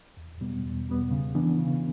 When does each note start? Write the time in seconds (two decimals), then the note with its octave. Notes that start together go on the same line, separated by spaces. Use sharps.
0.17 E2
0.41 B2 G3 B3
0.64 E2
0.88 B2 G3 B3
1.11 C#3
1.35 E3 B3 D4
1.58 C#3